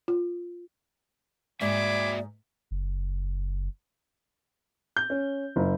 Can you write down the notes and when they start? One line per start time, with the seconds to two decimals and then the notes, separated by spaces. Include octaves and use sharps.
0.08 F4
1.61 G#2 A#3 F#4 D5 E5 G#5 B5 D6
2.71 F#1
4.97 G6
5.10 C#4
5.56 F#1